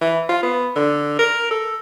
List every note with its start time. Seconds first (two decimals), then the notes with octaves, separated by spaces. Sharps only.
0.01 E3
0.29 F4
0.43 B3
0.76 D3
1.19 A#4
1.51 A4